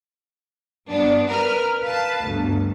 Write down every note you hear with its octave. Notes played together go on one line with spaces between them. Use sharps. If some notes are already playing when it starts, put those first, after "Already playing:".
G2 B3 D4
A#4 B4 F6
B4 F5 A5
G1 D2